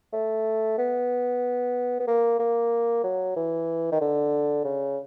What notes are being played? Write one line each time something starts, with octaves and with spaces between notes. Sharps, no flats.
A3
B3
B3
A#3
A#3
F#3
E3
D#3
D3
C#3